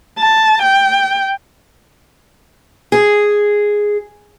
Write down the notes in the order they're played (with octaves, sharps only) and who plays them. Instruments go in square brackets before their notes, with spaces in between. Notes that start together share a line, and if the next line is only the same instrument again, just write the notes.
[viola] A5
G5
[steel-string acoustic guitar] G#4